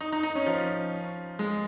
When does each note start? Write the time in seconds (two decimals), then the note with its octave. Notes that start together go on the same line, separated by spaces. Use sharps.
0.01 D#4
0.13 D#4
0.23 D#4
0.35 C#4
0.46 F3
1.39 G#3